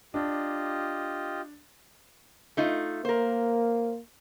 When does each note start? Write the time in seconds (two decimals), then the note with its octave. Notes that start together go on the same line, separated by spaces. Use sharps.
0.14 D4 F4 G4 D#5
2.57 A3 D#4 F4
3.05 A#3 A#4 C5